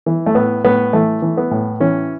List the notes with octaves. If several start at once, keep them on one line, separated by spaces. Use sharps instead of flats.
E3
A3
A2 B3
A2 B3
E3 A3
E3
B3
A2
E3 C#4